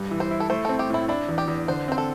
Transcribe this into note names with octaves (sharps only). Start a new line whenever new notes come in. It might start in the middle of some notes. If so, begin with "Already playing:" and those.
Already playing: G2
E3
C5
E4
A4
A3 C5
C4 A4
G4
A2 E4
D4 E4
E2
G4
E2
D3 C5
C4 C5
A4